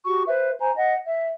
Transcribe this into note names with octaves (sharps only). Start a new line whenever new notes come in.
F#4 G4 C#6
B4 C5 E5
C5 G#5 A#5
D#5 F#5
E5